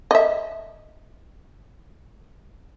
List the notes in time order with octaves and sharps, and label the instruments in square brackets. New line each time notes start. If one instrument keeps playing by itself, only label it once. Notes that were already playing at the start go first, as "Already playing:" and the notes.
[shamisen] D#5 E5